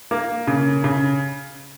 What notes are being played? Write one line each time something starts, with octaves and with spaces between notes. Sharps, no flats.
A#3
C#3
C#3